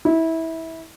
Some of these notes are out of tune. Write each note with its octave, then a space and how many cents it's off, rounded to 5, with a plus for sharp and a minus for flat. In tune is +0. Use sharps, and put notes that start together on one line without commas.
E4 -20